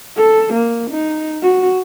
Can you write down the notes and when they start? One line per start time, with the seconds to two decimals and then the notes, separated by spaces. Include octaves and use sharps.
0.17 A4
0.54 A#3
0.91 D#4
1.43 F#4